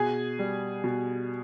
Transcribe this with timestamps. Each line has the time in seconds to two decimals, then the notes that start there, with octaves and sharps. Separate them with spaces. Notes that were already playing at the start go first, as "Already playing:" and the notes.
Already playing: B2 G#4 G#5
0.39 G3
0.84 B2